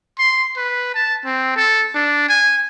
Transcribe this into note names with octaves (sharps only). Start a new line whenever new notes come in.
C6
B4
A5
C4
A4
D4
G#5